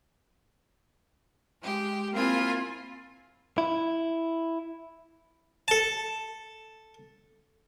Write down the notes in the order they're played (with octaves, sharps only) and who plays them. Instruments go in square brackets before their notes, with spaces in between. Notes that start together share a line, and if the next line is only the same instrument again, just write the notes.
[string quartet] G#3 G4
A#3 C4 E4 F4 G#5
[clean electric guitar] E4
[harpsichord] A4 A5